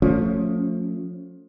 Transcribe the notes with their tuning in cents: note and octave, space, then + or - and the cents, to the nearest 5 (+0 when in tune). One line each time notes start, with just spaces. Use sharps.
F3 +25 A3 +20 C#4 +10